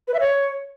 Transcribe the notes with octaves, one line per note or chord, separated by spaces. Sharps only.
B4
E5
C#5